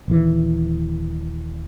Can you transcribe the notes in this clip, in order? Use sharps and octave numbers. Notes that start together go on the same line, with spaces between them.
D#1 D#2 E3